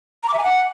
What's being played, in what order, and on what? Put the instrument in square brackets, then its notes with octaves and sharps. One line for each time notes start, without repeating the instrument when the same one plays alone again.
[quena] A#5
D6
E5
G#5
F#5